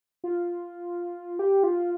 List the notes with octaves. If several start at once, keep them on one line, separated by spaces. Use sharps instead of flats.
F4
G4
F4